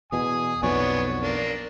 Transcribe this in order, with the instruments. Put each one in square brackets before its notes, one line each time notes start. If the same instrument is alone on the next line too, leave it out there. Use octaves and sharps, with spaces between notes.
[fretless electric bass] E2 B2 [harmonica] G#5 D#6
[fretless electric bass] B1 F2 B2 [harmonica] B3 D4 C#5
[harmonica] A#3 D4